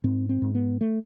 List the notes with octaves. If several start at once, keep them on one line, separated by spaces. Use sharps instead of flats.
G#2 C4
C4
G#2
B3
A3